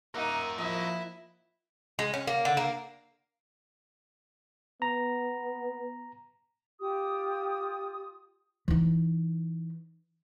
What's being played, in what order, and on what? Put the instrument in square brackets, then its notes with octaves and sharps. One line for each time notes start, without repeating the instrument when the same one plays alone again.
[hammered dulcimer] A#3 F#5 [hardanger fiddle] D#4 [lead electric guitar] A#4 E5
[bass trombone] F3 [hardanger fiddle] E4 [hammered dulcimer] D#5
[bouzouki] G#3
C#4
A#3
D3
A#3
[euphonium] B3 [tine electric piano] A#5
[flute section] F4 G4 D#6
[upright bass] E3 D#4